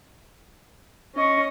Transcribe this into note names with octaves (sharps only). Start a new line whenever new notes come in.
C#4 D#5 C#6